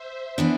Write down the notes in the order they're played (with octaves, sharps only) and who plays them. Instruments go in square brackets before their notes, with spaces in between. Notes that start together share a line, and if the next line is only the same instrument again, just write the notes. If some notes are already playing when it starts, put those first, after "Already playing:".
Already playing: [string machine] C5 E5
[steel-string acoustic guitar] E3 B3 D4